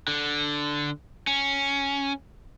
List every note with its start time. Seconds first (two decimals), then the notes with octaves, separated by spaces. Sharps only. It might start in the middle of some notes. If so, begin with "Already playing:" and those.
0.08 D3
1.27 C#4